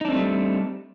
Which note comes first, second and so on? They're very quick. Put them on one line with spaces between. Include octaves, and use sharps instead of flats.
D#4 D4 C4 A3 G3